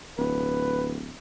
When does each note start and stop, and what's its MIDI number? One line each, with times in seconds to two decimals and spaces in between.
0.18 1.14 26
0.18 0.95 71